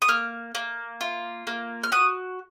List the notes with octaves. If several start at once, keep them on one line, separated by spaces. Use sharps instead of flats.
D#6
A#3 F6
A#3
F4
A#3
F6
F#4 D#6